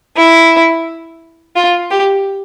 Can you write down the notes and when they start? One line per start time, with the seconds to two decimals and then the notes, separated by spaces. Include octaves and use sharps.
0.17 E4
1.56 F4
1.91 G4